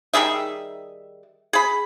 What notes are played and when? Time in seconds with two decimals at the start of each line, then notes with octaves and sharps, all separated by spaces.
0.14 D#3 G3 G#4 E5
1.53 G#4 B5